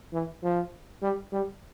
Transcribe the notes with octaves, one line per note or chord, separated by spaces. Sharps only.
E3
F3
G3
G3